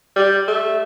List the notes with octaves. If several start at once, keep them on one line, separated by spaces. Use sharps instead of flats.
G3
A3